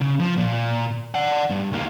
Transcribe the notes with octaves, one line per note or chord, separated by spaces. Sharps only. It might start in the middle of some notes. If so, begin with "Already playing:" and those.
C#3
F3
A#2
D5 F#5
G2
D2 A#3